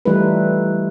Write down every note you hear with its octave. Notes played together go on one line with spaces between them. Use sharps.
E3 G3 A3 D#4 F4 B4